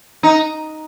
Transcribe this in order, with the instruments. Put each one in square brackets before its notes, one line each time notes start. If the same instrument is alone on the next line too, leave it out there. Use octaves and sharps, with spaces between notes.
[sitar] D#4